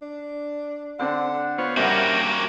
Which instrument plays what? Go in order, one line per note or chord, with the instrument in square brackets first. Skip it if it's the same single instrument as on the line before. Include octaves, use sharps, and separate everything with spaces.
[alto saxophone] D4
[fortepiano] D3 C4 D4 [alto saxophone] F#5
[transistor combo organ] B3 F4 C#5 [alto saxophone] C5
[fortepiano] G2 F#5 [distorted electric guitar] A#3 F#4 [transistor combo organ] C#4 G4 A#4 [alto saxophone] E5